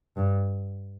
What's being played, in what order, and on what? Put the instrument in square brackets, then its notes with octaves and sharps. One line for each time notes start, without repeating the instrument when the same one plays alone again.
[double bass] G2